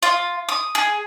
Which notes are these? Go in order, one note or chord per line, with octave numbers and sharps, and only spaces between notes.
F4
D#6
G#4